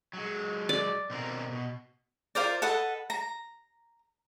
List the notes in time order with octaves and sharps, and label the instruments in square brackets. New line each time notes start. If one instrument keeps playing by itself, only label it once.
[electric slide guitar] F#3 G#3
[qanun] D5
[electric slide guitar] B2 C4 A#4
B2
[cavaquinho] F4 A#4 C5 D5
A4 B4 D#5 F#5
A#5